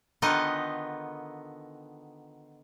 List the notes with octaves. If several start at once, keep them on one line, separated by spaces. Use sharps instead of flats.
D3 D#3 B3 D#4 F4 D#5